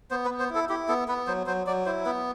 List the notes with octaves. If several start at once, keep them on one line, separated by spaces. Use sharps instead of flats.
B3 C5
B4
B3
C5
E4 A4
E4 G4
B3 A4
B3 B4
F#3 C5
F#3 C5
F#3 D5
E4 C5
B3 B4